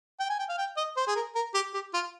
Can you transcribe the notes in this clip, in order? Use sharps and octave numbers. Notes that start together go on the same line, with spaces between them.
G5
G#5
G5
F5
G5
D#5
C5
G#4
A#4
A#4
G4
G4
F4